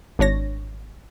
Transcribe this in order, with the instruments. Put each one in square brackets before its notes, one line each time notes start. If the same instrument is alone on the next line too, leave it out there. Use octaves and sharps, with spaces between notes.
[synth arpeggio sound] G#1 D4 C#5 A#6